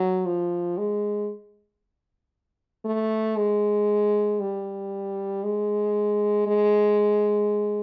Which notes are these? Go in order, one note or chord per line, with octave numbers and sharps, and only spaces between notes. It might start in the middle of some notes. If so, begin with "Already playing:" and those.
Already playing: F#3
F3
G#3
A3
G#3
G3
G#3
G#3